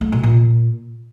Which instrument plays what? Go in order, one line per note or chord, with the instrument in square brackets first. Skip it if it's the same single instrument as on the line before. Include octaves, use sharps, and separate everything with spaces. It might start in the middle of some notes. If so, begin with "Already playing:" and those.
[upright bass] A3
B2
A#2